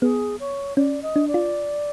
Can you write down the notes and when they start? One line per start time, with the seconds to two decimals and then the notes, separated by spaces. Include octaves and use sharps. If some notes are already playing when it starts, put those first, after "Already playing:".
0.02 B3 G#4
0.40 C#5
0.77 C#4 D5
1.02 D#5
1.16 D4
1.28 D5
1.34 F4